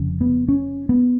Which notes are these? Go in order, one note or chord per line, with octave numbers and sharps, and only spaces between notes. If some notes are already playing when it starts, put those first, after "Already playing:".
Already playing: F1 F2 C#3
B3
C#4
B3